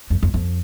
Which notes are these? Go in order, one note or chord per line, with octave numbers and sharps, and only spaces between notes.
F2
F2
F2